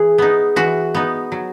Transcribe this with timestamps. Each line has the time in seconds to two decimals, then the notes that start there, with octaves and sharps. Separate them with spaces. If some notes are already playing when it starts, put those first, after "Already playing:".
Already playing: E3 G#4
0.18 B3 D#4
0.56 E3 F#4
0.94 B3 D#4
1.32 F#3